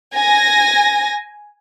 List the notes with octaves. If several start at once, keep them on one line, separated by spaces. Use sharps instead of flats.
G#5 A#6